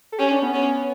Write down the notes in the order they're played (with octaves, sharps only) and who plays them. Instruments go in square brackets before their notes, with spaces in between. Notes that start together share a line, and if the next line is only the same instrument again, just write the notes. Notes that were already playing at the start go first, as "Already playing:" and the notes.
[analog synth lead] A4
[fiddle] C#4 [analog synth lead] G4
[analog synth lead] D4
B3
[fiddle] C#4